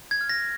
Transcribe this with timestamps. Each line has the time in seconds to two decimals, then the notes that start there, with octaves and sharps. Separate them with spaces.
0.11 G#6
0.21 F6
0.29 A#6